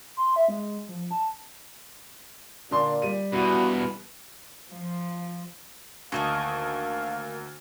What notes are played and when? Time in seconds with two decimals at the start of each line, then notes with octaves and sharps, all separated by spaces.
0.17 C6
0.36 E5
0.48 G#3
0.89 F3
1.11 A5
2.71 A#2 D3 D4 C6
3.02 G3 D#7
3.32 E2 B2 F#4 B4
4.71 F3
6.12 D2 D#3 A#3 D#5 F5 A5 C#6